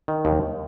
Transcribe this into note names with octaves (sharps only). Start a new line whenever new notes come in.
D#3
D#2